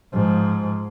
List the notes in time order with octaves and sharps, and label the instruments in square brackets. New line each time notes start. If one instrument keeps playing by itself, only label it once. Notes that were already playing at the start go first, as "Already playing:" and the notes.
[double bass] G#2 F3